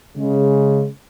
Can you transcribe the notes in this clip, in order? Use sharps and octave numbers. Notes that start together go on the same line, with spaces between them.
C#3 G#3